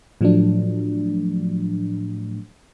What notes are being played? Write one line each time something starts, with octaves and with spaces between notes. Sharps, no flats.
A2 F3 F#3 A3 D4